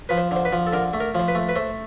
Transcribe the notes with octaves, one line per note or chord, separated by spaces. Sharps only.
F3 B4
C5
D3 C5
B4
F3
A4
D3 A#4
A3
A#4
F3 C5
B4
A3
B4
A3 C5